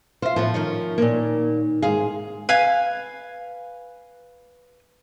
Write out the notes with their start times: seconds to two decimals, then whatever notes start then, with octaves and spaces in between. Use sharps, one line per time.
0.22 F4 C5 E5
0.36 A2 F3 B3 E4
0.54 D#3 C#4 D#4
0.98 A#2 A#3
1.82 G#2 G#4 F5
2.49 B4 F5 G#5